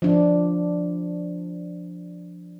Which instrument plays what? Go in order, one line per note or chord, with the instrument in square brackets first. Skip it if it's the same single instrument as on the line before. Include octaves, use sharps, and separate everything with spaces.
[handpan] F3 D4